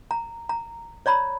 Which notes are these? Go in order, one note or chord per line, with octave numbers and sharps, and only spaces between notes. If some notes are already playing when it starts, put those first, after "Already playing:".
A#5
A#5
C#5 D5 A#5 B5